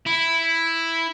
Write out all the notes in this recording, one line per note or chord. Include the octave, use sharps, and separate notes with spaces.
E4